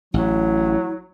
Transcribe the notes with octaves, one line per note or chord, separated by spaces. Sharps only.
A1 F#3 E4